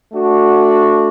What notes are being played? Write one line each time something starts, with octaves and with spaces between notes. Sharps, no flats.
A3 D4 F#4